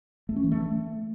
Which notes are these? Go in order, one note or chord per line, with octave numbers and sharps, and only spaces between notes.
A3
C#4
E3
A3